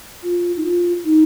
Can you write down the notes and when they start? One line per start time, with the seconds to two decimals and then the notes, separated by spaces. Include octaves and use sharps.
0.23 F4
0.57 D#4
0.64 F4
1.04 D#4